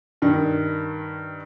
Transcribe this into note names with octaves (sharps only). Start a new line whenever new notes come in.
G2 D#3